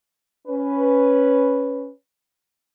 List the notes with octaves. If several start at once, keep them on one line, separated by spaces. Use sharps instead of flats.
C#4 B4